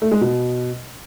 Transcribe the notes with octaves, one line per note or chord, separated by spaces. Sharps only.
A3
G#3
B2